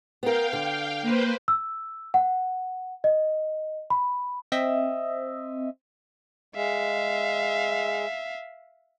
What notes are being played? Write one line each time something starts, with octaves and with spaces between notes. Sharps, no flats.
B3 A#4 F5 G5
D3
A#3 B4 C5
E6
F#5
D#5
B5
C4 D#5 E5
G#3 E5 F5